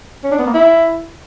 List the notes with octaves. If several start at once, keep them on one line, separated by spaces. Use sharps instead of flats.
C#4
D4
B3
A#3
E4